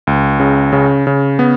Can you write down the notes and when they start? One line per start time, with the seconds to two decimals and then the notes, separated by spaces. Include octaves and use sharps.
0.07 C#2
0.40 C#3
0.73 C#3
1.07 C#3
1.39 B3